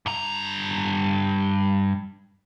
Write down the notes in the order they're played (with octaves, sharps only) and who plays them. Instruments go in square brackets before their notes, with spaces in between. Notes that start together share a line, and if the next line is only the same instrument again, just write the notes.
[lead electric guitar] G2 A#5